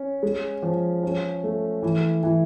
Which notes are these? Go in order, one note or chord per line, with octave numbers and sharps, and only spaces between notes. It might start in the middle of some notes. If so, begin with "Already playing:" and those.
Already playing: C#4
G#3
F3
C#4
A3
E3
E3